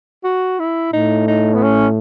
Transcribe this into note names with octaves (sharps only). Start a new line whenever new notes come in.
F#4
E4
A2 D#4
D#4
B3
C#4